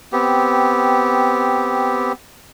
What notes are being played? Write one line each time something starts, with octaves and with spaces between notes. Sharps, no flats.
B3 C4 G4